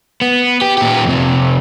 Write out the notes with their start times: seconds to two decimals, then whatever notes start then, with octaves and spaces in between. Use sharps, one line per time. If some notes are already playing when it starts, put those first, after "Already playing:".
0.21 B3
0.61 G4
0.78 A#2 G4
1.05 F2 C3